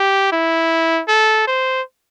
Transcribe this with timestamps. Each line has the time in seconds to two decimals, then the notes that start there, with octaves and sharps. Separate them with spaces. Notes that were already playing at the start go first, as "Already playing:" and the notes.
Already playing: G4
0.32 E4
1.08 A4
1.48 C5